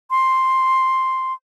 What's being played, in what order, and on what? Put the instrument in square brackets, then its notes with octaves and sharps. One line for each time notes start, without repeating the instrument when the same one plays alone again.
[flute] C6